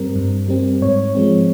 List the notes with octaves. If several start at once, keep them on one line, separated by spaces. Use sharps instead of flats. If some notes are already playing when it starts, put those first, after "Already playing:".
Already playing: G2 G3 C4 A#4
G2
G3 C4
G#2 C#5
F3 G#3 C4